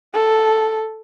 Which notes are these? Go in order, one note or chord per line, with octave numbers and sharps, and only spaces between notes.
A4